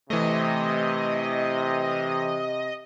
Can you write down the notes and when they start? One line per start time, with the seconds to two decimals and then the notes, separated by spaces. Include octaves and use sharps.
0.10 C3 E3 A3 D#5